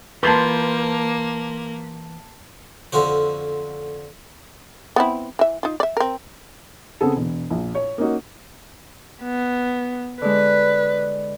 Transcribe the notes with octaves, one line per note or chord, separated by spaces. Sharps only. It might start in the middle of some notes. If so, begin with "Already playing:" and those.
E3 A#3 F4 B4 A5 C6 G6
F2 D3 F4 F#4 C5
B3 C4 E4
E3 E5
D#4 F4
D5 E5
C4 A#4
C#3 B3 C4 G#4 A4
E1
A#1
C#5
A#3 C#4 D#4 F#4
B3
D3 G#3 B4